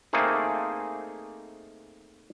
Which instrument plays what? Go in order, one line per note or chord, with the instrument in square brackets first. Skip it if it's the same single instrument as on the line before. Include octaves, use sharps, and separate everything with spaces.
[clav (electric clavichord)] A3 A#3 C4 D#4 G#4